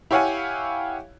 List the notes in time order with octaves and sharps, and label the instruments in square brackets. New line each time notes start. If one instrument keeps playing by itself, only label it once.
[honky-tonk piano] E4 G4 C#5 F5 F#5 G#5